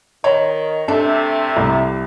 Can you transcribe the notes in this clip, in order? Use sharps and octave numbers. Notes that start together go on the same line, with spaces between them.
D#3 C#5
C3 A3 D4 A4
C2